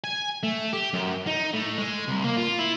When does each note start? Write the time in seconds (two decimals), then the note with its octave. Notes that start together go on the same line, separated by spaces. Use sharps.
0.04 G#5
0.43 A3
0.73 G4
0.94 F#2
1.27 D#4
1.54 A2
1.78 G#3
2.08 C2
2.24 A#3
2.37 F4
2.59 E4